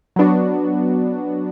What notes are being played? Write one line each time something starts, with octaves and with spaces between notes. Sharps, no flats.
F#3 B3 D4 F#4